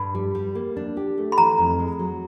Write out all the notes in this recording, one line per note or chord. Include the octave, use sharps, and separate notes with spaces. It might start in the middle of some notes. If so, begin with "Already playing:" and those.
Already playing: G2 B5
G3
G3
A#3
D4
G4
A3
B5
E3 A#5
F2
G#3
F#3